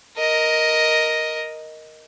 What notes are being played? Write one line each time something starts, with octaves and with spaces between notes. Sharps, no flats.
A#4 D#5